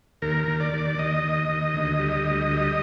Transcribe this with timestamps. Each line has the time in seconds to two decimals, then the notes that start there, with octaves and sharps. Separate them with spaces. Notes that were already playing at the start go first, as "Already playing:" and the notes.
0.22 D#2 A#4
0.48 D#2
0.60 D5
0.74 D#2
0.99 D#2 D#5
1.24 D#2
1.49 D#2
1.74 D2
1.99 G3
2.24 D2
2.51 G3